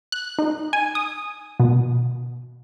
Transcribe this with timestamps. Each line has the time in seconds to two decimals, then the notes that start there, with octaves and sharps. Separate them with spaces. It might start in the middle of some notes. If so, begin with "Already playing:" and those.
0.12 F#6
0.39 D#4
0.73 G#5
0.95 D#6
1.60 B2